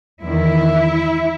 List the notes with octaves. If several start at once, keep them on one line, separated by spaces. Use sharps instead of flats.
E2 D#3 E4